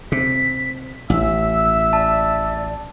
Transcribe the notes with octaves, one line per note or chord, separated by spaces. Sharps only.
C3 B6
A1 E5 E6
D5 A5